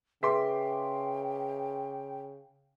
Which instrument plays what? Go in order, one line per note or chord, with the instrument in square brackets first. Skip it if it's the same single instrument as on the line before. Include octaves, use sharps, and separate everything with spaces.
[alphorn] C#3 [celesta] G#4 B4 E5 [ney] G5 [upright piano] C6 D6 B6